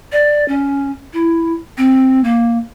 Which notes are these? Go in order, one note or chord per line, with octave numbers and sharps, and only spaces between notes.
D5
C#4
E4
C4
A#3